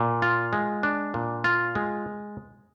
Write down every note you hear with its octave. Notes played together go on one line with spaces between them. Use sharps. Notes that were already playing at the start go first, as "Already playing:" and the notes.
Already playing: A#2
F4
G#3
D4
A#2
F4
G#3